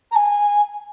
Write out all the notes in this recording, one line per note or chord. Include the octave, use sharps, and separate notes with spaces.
A#5
G#5